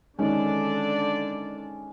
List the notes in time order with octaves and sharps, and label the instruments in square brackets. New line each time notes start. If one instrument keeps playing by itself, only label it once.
[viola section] D3 D4 D5 [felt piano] D#3 G#3 C#4